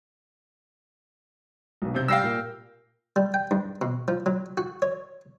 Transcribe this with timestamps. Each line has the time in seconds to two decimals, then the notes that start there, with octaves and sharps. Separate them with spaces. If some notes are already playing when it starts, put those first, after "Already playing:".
1.82 B1 B2
1.94 C3 C4 G6
2.08 G3 F5 G5 E6 A#6 C7
2.24 A#2
3.16 G3
3.34 G5
3.51 G2
3.82 B2
4.08 F3
4.26 F#3
4.57 F#4
4.82 C#5